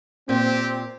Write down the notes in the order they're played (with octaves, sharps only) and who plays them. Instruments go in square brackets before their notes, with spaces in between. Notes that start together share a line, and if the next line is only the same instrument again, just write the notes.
[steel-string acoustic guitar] A#2 [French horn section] C4 [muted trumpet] G4